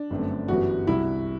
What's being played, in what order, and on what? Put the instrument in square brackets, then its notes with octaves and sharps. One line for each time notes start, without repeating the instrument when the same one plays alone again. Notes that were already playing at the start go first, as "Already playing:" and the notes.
Already playing: [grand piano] D4
[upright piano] G1 F#2 D3 A3 C4
[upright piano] G1 F#2 E3 G3 B3 [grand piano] F#4
[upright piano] C2 C3 G3 [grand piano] E4